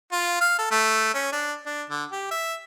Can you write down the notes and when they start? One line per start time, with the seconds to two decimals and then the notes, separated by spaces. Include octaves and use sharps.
0.12 F4
0.41 F5
0.58 A4
0.71 A3
1.14 C#4
1.32 D4
1.66 D4
1.89 D3
2.11 G4
2.31 E5